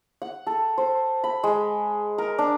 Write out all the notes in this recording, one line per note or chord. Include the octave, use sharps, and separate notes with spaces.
F#5
A4
C5
B5
G#3
A#4
D4